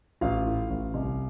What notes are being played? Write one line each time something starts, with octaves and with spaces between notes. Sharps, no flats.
A1 F4 F5
A2
A1
C2